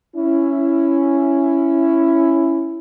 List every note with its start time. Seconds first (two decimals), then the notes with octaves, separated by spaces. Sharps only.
0.16 C#4 E4